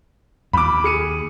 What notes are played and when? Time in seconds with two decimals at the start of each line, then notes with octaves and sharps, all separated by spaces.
0.53 D#2 B5 D6
0.84 G#4 C#7 D#7